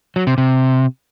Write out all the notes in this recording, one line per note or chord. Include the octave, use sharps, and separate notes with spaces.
F#3
C3
C3